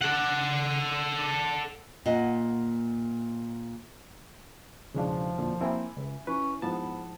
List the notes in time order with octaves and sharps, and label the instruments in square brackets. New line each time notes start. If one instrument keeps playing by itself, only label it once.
[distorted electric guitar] A4 F#5
[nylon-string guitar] A#2 D#5 F#5
[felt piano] E1 E3 F5 [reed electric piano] C#3 G#3 D4 [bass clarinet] F3
[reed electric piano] F2 A#2 D3
[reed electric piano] A#3 C4 E4 [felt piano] E5 G#5 B5
[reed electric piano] C#2
[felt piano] E3 [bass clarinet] C#4 [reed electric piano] B4
[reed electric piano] G#2 F3 A5 [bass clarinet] B3 [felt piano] E4 C5